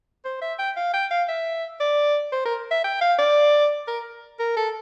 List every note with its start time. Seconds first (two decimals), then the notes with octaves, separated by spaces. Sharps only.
0.25 C5
0.42 E5
0.59 G5
0.77 F5
0.93 G5
1.11 F5
1.29 E5
1.80 D5
2.32 C5
2.46 A#4
2.71 E5
2.84 G5
3.01 F5
3.19 D5
3.88 A#4
4.40 A#4
4.57 A4